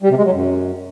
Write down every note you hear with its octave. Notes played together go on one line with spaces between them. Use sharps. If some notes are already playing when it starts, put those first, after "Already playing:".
G3
C3
G#3
F#3
F#2